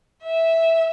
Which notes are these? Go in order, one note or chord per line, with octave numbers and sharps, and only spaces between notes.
E5